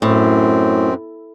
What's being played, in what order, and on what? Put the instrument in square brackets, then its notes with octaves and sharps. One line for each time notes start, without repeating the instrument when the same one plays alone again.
[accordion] F#2 C4 [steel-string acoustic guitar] A2